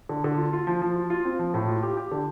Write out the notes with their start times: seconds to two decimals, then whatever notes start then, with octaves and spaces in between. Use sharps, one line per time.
0.09 D3
0.24 D3
0.38 F4
0.53 F4
0.67 F3
0.82 F3
0.96 F4
1.10 F4
1.25 C4
1.39 F3
1.54 A2
1.68 F4
1.82 G4
1.97 G4
2.12 D3